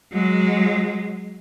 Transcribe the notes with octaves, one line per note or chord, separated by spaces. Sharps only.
F#3 G#3